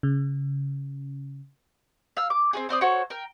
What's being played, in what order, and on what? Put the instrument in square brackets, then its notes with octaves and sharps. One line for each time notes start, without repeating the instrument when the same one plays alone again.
[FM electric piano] C#3
[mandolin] F5 E6
D6
C4 F#4 G#4
C4 C5 D5 D#6
F#4 A4 C5 C#5
A#4 G5